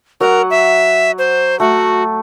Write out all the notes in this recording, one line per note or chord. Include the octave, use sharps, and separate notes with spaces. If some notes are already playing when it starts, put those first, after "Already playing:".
F#3 A#4 F#5
E5
C5
A3 F#4